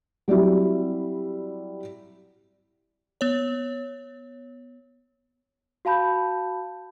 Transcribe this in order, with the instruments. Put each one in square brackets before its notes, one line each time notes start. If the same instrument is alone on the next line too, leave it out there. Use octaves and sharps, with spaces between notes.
[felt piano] F#3 G3 C4 E4
[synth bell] B3 C#5
[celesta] F#4 F5 A5 B5 G6